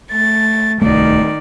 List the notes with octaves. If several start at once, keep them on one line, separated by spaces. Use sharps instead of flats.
A3 A6
D1 C2 D#3 A3 D5